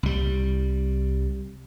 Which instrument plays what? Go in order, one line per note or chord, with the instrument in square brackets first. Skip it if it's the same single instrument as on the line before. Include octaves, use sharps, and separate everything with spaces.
[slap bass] C2 G3